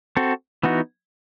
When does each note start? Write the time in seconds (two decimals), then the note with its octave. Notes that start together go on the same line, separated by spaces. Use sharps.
0.17 C4 F#4 A4
0.63 E3 B3 D#4 F#4